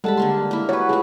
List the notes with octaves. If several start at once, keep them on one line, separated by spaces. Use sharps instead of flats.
G3 G#3 A4 F#5 A5 B5
D3 A#3 C6
A#3 E4
F#4 B4 C#5 F#5
A3 F4 F#4 G#4